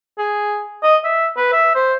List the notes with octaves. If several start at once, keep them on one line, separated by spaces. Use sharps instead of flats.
G#4
D#5
E5
B4
E5
C5